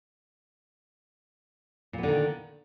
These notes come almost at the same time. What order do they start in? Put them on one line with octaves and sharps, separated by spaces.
A#2 B3 D3 D#3